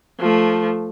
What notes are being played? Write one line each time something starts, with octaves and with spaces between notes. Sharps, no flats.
F3 A3